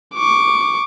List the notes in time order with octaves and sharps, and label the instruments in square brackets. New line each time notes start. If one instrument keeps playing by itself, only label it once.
[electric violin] C#6 D6